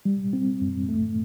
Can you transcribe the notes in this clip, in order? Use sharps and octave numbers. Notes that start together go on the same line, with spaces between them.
G3
C4
F#2
A3